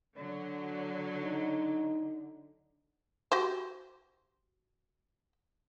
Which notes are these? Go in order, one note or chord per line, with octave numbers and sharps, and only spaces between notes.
D3 F#3
D#4
F#4 G4 C5